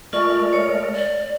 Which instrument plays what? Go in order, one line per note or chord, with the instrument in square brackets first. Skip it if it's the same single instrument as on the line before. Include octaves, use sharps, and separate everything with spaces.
[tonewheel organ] G#3 A3 A#4 [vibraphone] F4 C#6 [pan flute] D5
[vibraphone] C#5
[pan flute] D5